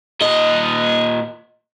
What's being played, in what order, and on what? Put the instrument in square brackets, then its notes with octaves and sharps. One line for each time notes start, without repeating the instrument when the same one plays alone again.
[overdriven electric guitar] A#2 D#5